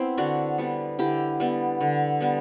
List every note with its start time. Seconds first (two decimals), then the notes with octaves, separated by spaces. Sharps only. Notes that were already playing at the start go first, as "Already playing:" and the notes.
Already playing: B3 C4 E4
0.18 D3 D4 F#4
0.58 G3 B3
0.99 D3 E4 G4
1.40 G3 B3
1.81 D3
2.21 G3 B3